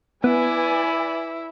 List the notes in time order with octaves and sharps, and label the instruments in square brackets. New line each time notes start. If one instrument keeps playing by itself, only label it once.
[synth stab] B3 [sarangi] E4 [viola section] B4 D5 G#5